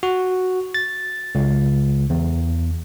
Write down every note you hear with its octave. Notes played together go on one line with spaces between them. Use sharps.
F#4
A6
C#2
E2